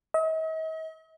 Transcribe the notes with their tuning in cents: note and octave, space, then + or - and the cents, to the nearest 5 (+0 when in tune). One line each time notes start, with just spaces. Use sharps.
D#5 +45